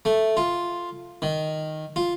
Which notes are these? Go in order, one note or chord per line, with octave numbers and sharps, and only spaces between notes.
A3
F4
D#3
F4